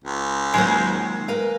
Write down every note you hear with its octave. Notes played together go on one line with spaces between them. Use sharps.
C#2
D#3 F#3 G#3 A#3 C5
A#4 B4 F5